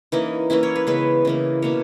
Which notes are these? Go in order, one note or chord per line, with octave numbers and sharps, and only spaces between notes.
E3 A#3 C#4 D#4
E3 A#3 C#4 E4
C#5
B4
C#3 G#3 B3 B4
C#3 E3 A#3
B2 A#3 C#4 C#5